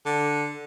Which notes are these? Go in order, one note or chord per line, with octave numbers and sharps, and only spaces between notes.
D3